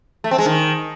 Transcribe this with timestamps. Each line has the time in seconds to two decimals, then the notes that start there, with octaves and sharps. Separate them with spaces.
0.24 A3
0.31 C4
0.38 G#3
0.46 D#3